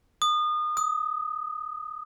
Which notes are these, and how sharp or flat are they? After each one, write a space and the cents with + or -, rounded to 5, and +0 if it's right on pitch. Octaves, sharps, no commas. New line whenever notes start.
D#6 -30
D#6 +20